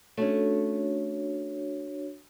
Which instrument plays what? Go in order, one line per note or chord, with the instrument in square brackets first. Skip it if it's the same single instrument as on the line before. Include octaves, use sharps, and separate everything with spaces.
[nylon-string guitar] A3 C#4 [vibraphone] D4 F#4 C#5